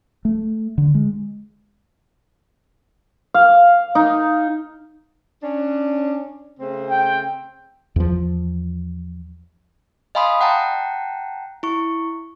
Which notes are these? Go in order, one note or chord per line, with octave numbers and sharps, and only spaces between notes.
A3
D3
G#3
F5
D#4
C#4 D4
C#3 A3 C4
G5
E2 F3
D#5 F5 G#5 B5 C6 D#6
F#5 G5 A5 A#5
E4 C#6